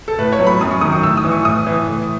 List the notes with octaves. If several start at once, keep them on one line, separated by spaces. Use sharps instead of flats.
A4
A2 B4
C#5
F#3
B5
F#2 D#6
C#6
D#3 F#3 D#6
C#6
A2 E6
D#6
E3
C#6
A2 D#6
E3
A2